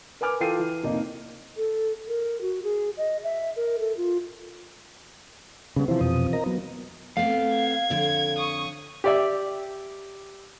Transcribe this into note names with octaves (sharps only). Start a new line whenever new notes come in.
A#4 B4 G#5 D6 F6
E3 F4 A4 G5 C7 D#7
E3
F1 A#3 D#4
A4
A#4
F#4
G#4
D#5
E5
A#4
A4
F4
C#3 G3 B3
C3 E3 F3 E4 C5
F2 B2 D#6
A#4 D#5 A#5
F#3 B3
A3 B3 C4 F5
G#6
F2 D3 C#5
C#6 D#6
G4 D5 E5